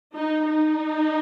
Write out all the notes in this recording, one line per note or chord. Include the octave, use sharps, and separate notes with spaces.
D#4
D#4